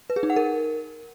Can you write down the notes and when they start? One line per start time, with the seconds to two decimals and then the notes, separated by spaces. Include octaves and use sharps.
0.10 B4
0.16 G#4
0.23 D#4
0.30 F#5
0.36 A#4